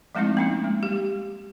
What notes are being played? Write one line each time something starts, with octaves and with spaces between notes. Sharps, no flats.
F3 G#3 A3 C4 D#4 E4
A#3 C#4 D#4
G#3
G3 G4